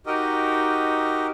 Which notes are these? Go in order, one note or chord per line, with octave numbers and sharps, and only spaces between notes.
D#4 F#4 G4 A#4 D#5